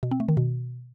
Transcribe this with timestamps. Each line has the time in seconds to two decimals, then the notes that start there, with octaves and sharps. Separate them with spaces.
0.03 B2
0.11 C4
0.20 A3
0.29 D#3
0.37 B2